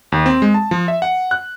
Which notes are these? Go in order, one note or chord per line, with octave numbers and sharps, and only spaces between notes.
D#2
C4
G#3
A5
F3
E5
F#5
F#6